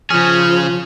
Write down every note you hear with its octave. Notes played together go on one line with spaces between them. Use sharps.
C#3 F3 C#4 G#4